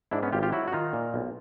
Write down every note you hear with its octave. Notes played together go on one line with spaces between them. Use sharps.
G#2 D4 E4
B3 C#4
G#1 F4 G4
F4 G4
F#3 E4 F#4
F#4
D#3 D#4 F4
A#2
B1